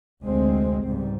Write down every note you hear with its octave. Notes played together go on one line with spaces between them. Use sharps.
F1 D2 G#3 C4
C#2 G#2 G3